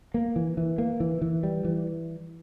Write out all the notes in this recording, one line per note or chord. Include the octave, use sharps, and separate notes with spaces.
A#3
E3
E3
A#3
E3
E3
G3
E3